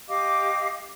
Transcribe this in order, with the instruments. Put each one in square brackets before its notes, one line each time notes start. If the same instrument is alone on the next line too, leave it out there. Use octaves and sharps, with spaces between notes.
[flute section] G4 D#5 F5 D6